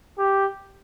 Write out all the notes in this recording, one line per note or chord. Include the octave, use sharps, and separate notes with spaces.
G4